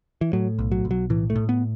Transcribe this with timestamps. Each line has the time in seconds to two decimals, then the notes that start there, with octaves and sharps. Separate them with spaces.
0.21 E3
0.33 A2 F#3
0.59 B1
0.72 F#3
0.85 B1
0.91 F#3
1.10 A2 E3
1.30 A3
1.36 A2
1.49 B3